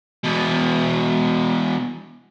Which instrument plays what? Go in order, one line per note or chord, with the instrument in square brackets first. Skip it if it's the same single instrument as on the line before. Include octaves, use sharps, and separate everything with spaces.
[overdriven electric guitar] E2 B2